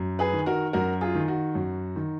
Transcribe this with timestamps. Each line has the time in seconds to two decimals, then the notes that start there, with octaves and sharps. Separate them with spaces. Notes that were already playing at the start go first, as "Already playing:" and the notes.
Already playing: F#2
0.19 G#4 B4
0.33 D#3
0.46 F#4 A#4
0.73 F#2 F#4 A#4
1.01 F4 G#4
1.15 D#3
1.28 F#4
1.55 F#2
1.96 D#3